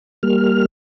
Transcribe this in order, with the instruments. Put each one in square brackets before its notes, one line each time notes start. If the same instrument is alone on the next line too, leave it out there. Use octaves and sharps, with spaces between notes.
[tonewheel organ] G3 A#3 F6